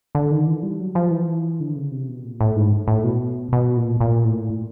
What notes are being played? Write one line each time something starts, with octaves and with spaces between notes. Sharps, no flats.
D3
D#3
E3
G3
F#3
F3
E3
D3
C#3
C3
B2
A#2
A2
G#2
A2
B2
B2
A#2
A#2
A2